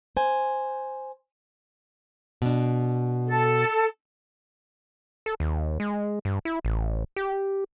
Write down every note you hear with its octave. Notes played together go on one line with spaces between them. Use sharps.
C5 G#5
B2 D4
A4
A4
D#2
G#3
G2
E4
A1
G4